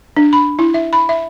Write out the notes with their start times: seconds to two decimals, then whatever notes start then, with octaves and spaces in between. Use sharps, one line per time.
0.17 D4
0.33 B5
0.59 E4
0.74 E5
0.93 B5
1.09 E5